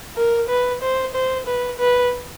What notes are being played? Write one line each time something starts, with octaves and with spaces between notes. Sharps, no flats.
A#4
B4
C5
C5
B4
B4